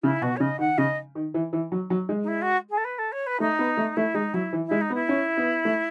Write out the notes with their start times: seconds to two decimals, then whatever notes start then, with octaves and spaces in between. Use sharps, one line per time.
0.03 C#3 E4
0.22 B2 F#4
0.36 C#5
0.40 C#3 D#5
0.59 D#3 F#5
0.78 C#3 D#5
1.15 D#3
1.34 E3
1.53 E3
1.72 F#3
1.90 F#3
2.09 G#3
2.23 D#4
2.28 E4
2.42 F#4
2.70 G#4
2.77 A4
2.84 B4
2.98 A4
3.12 C#5
3.26 B4
3.40 A3 D#4
3.59 B3
3.77 A3
3.96 A3 E4
4.14 G#3 D#4
4.34 F#3 E4
4.53 E3
4.66 E4
4.71 G#3
4.81 D#4
4.90 B3
4.94 E4
5.09 C#4
5.37 B3
5.65 A3